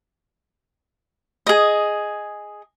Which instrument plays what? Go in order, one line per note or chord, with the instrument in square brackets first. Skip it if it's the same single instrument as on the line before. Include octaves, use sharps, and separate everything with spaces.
[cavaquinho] G#4 D#5